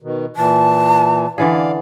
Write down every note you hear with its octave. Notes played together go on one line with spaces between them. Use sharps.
B2 D#3
A#2 E3 A5
D3 E3 G#4 D5 F5